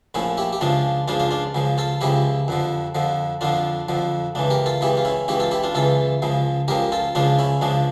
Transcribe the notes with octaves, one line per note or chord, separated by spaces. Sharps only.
A#1 A2 F3 C#4 E4
E4 G4
G4
C#2 C#3 F3 D4 F4
C#2 C#3 F3 D4 F4
D4 F4
D4 F4
C#2 C#3 F3
F4 A4
C#2 C#3 F3 E4 G4
F2 D3 F3
F2 D3 F3
F2 D3 F3 D4 F4
F2 D3 F3
C#2 C#3 E3 D4
G4 A#4
F4 A4
C#2 C#3 E3 E4 G4
F4
C#4 E4
C#2 C#3 E3 E4 G4
F4 A4
E4 G4
D4 F4
C#2 C#3 E3 F4 A4
C#2 C#3 F3
C#2 C#3 F3 G4 A#4
F4 A4
C#2 C#3 F3 D4 F4
C#4 E4
C#2 C#3 F3 D4